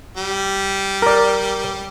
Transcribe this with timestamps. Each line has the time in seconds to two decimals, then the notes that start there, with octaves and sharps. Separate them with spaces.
0.17 G3
1.02 A#4 D5